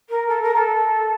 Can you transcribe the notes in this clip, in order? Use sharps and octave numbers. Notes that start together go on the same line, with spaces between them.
A#4
A4
A#4
A4